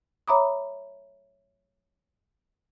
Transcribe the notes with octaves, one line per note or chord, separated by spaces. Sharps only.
C#5 E5 A#5 B5 D6 D#6